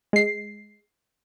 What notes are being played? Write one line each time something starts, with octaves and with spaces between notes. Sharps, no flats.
G#3 C7